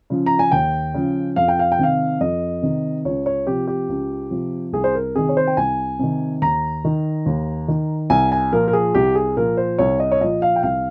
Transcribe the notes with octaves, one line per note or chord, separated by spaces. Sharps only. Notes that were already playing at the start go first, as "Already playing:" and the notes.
C#3 F3
A#5
G#5
D#2 G5
C#3 F3
F2 F5
G5
F5
G5
C3 D#3 F5
F2 D#5
C3 D#3
C#2 C#5
C#5
C3 F3 G4
G4
C#2
C3 F3
C2 G#4
C5
A#4
C3 D#3 G#4
C#5
C5
G5
C2 G#5
C3 D#3
D#2 A#5
D#3
D#2
D#3
C2 G#5
G#5
A#2 F3 A#4
A#4
G#4
C2 G4
G#4
A#2 F3 A#4
C5
C2 C#5
D#5
C#5
A#2 F3 D#5
F5
G5
C2 F5